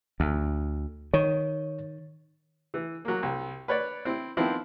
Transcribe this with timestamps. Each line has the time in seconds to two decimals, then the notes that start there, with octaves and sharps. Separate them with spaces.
0.20 D2
1.14 D#3 C#5
2.74 E3
3.05 F#3 A#3
3.23 C2
3.68 B4 C#5 D5
4.05 C4 E4
4.37 D#3 F3 B3 C4 E4